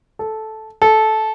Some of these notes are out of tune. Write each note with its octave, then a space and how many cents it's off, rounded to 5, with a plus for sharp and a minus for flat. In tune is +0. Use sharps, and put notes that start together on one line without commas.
A4 -10
A4 -15